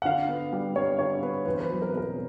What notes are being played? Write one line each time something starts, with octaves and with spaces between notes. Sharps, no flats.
F#5
D3 F5
B3
G3
G2 C#5
D3 C#5
B3 B4
E2 B4
C5
B4
F#3
A#4
B4
B2 A#4